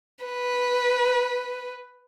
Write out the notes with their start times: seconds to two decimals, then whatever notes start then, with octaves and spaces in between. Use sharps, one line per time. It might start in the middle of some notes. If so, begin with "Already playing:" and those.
0.25 B4